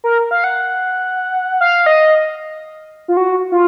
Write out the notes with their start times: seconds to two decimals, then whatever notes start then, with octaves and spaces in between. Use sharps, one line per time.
0.04 A#4
0.31 F5
0.44 F#5
1.61 F5
1.86 D#5
3.08 F4
3.17 F#4
3.52 F4